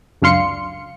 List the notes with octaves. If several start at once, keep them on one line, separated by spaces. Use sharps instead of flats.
C#2 F#2 D4 F5 C6 C#7